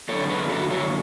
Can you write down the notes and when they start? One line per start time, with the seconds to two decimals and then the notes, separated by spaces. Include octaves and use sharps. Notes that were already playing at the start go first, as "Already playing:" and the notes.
0.09 F#2 D3 A4 C#5
0.29 G#4 B4
0.49 F#4 A4
0.70 A4 C#5